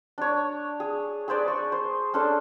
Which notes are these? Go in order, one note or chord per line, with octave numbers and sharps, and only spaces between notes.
D4 C#5
G#4
G#4 B4 C5 D5
C#6
C5
C#4 D4 A4 C5